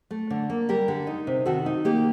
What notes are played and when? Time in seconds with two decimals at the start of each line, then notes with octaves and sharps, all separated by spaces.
0.11 A3
0.30 D3
0.50 A#3
0.69 G3 G4 A#4
0.88 D3
1.07 D#4
1.27 C3
1.46 D#3 F#4 A4
1.66 D#4
1.85 A#3 G4 A#4